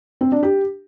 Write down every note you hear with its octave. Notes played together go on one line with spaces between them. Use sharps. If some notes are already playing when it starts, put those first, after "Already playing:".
C4
D4
G4